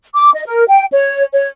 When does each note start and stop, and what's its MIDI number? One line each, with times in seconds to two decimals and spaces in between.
0.14 0.31 86
0.33 0.44 75
0.46 0.64 70
0.68 0.84 79
0.92 1.24 73
1.33 1.48 73